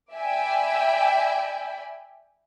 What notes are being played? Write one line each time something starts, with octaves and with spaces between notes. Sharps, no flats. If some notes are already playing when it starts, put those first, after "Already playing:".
D5 E5 G5 G#5 B5